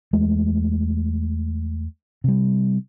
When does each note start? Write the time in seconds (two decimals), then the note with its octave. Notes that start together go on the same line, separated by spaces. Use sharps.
0.13 E2 G#3 A3
2.24 C3 G3